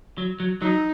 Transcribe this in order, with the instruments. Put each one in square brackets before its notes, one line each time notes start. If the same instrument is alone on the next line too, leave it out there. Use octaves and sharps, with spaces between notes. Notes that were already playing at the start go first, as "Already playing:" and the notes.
[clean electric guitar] F#3
F#3
[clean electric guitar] F#3 [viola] D#4